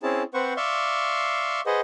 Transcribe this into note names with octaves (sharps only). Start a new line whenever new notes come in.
C4 C#4 E4 G#4 A5
C4 B4 C5 F#5 C#6
D5 E5 F5 C6 C#6
G#4 B4 C5 D#5 F#5